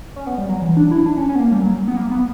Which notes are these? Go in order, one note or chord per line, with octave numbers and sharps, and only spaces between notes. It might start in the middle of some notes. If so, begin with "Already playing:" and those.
C#4
B3
G3
F#3
E3
D4
E4
D4
C#4
C#4
B3
A#3
G3
F#3
B3
A#3
B3